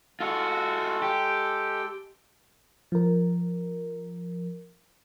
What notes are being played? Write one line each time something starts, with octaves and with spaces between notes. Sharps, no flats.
G#3 F4 F#4 A4
G4
F3 A#4